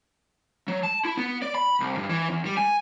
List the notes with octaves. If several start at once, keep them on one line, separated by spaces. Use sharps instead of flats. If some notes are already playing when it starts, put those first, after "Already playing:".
F#3
A5
E4
B3
D5
B5
C2
G2
E3
E2
G3
G#5